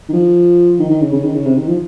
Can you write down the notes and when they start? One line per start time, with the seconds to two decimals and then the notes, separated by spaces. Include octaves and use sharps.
0.09 D#3
0.13 F3
0.79 D#3
0.90 D#3
1.02 C#3
1.13 C#3
1.24 D#3
1.35 C#3
1.45 C3
1.57 D#3
1.68 F3